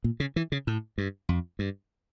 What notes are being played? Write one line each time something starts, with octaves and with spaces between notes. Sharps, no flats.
A#2
C#3
E3
C#3
A2
G2
F2
G2